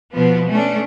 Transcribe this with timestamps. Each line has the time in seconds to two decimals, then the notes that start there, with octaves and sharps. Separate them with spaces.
0.13 B2 F3 B3
0.49 A3 C#4 D4